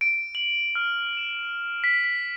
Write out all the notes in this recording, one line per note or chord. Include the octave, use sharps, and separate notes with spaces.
D7
F#7
F6
E7
B6
B6